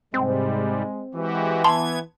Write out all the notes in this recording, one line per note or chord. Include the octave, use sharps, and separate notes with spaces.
G#2 C3 G3 G#3 C4
E3 G#3 F#4 G4
B3 A5 C6 G#6